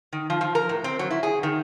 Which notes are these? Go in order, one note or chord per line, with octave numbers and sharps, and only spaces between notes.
D#3
F3
F3
A#4
A2
C4
F#3
E4
G#4
D#3